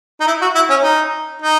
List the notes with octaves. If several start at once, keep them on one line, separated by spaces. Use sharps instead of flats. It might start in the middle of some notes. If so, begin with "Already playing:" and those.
D#4
E4
F#4
E4
C#4
D#4
D#4